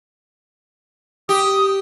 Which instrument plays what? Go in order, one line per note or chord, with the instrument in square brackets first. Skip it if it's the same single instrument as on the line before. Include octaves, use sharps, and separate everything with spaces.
[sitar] G4 [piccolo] D#6